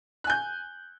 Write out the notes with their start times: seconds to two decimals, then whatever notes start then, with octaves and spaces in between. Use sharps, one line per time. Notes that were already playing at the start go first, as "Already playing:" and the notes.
0.24 F#6
0.27 G#5
0.30 G6